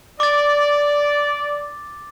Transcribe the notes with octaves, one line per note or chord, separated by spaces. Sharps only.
D5 D6 A6